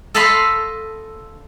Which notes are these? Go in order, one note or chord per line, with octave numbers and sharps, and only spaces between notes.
A4 D#5 F5 A5 B5 C6